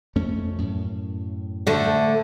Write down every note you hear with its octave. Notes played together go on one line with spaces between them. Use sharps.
F2 A3 C#4
F#2 A2
D3 A3